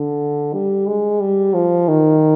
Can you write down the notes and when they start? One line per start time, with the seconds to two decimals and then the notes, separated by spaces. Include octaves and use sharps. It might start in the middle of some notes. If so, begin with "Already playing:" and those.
Already playing: D3
0.53 G3
0.87 G#3
1.20 G3
1.54 F3
1.88 D#3